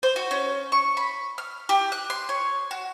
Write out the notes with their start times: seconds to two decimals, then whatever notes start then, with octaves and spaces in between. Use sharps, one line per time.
0.03 C5
0.16 F#4
0.31 C#4
0.72 C#6
0.97 B5
1.38 F6
1.69 G4
1.92 F#6
2.10 C6
2.29 C#5
2.71 F#4